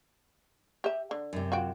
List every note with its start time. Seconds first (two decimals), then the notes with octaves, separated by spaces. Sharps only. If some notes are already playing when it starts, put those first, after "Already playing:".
0.84 G4 E5
1.11 D3
1.33 F#2 C3
1.52 F4 F#4 G5